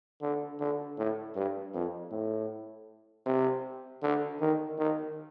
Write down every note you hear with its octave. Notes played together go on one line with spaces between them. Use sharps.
D3
D3
A2
G2
F2
A2
C3
D3
D#3
D#3